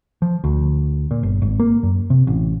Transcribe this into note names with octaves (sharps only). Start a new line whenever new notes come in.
F3
D2
A#2
G1
G#1
A#3
F#2
C3
A1